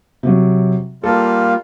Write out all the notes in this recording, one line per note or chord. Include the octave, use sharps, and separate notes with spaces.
C3 F#3
G3 A#3 F4 A4